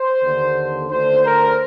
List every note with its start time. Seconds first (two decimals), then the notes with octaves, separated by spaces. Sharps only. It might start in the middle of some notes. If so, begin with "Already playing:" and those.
Already playing: C5
0.23 D#2 D3
0.89 D2 D3 C5
1.24 A#4